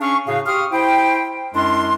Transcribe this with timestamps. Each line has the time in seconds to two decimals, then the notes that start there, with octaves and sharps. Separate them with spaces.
0.01 C#4 D4 G#4 F5 C#6
0.28 A2 C#3 F#4 G#4 F5
0.46 G4 F5 C6 C#6 D#6 F6
0.73 E4 C5 G5
1.55 F#2 G#3 D4 E4 C6